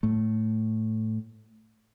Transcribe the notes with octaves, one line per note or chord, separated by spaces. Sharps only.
A2 A3